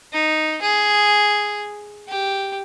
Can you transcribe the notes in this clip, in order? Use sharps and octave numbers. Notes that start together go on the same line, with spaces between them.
D#4
G#4
G4